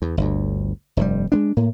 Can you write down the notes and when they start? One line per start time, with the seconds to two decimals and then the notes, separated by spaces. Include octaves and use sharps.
0.02 E2
0.17 G1 D2
0.97 F1 G2 B2 G3
1.32 G#3 B3 D4
1.57 A2 A#3